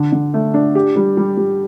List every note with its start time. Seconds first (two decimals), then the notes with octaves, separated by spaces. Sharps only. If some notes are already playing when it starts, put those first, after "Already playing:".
Already playing: D3
0.12 D3
0.34 A3
0.54 D4
0.75 G4
0.96 G3
1.17 G3
1.37 G3